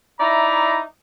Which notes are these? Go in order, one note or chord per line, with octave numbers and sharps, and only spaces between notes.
D#4 E4 D5 E5 A#5